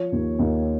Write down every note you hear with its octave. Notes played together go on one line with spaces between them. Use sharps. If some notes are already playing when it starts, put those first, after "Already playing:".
Already playing: F3 C#5
D#2
D#2